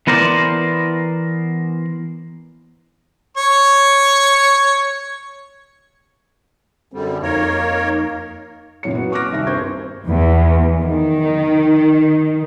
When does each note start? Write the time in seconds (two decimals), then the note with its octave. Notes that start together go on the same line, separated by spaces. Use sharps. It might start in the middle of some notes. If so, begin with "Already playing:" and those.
0.07 E3 B3 A#4 C5 D5
3.37 C#5 C#6
6.92 F#2 D3 G3 C4
7.23 F2 A#3 D#4 A#4 C#5 F5
8.83 F#2 A#2 E3 F#3 C#5 C#7
8.94 A#3 B3 F#4 B4
9.12 C#6 D6 F6 F#6 A#6 D7
9.30 C2 D#3 G3 E5 A#6
9.47 G2 A#4 C5 C#6 G6 G#6
10.08 E2
10.81 D#3